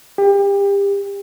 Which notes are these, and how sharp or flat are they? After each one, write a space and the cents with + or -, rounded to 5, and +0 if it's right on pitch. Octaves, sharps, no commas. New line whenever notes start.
G4 +30